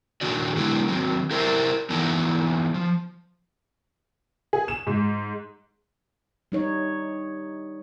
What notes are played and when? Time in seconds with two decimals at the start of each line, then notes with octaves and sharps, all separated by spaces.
0.21 A#2 D#3 D4 F#4 D5
0.57 D3 G#3 B3 E4 G4
0.87 D#3 F#3 B3 C4
1.31 E4 G4 A#4 C5 D5 E5
1.90 E3 B3 D#4 E4 D5 A5
2.74 F3
4.53 G#4
4.68 E7
4.87 G#2
6.52 G3 D#4 C#5